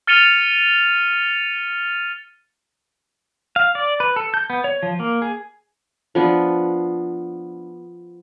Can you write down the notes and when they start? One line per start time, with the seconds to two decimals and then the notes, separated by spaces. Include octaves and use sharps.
0.07 F6 A6 C#7 D#7 F7 G7
3.56 F5
3.75 D5
4.00 B4
4.16 A4
4.34 G6
4.50 B3
4.64 C#5
4.83 F3
5.00 A#3
5.22 G#4
6.15 F3 B3 D4